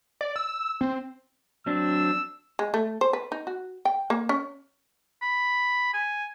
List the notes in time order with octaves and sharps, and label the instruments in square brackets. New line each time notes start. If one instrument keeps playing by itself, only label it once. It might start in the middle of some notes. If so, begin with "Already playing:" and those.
[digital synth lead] D5
E6
C4
[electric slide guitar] F#3 C4 D4 [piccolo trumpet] E6
[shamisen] G#3
A3
C5
B4
D#4
F#4
G5
A#3
C#4
[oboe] B5
G#5